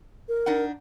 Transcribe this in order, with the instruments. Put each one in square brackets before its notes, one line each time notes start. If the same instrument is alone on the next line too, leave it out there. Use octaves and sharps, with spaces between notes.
[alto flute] A#4
[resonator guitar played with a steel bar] D4 D#4 F#5